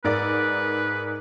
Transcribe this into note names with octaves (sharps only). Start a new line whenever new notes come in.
G#2 A#4 B4 D5